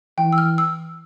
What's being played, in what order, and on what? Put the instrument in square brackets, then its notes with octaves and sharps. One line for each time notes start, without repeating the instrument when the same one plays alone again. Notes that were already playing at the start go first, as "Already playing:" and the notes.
[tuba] E3 [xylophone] G5
[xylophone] E6
F6
E6